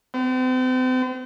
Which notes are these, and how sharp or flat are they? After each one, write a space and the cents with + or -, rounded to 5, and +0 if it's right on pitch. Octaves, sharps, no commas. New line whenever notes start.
C4 -40